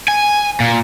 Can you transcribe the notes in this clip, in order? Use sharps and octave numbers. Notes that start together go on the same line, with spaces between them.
G#5
A#2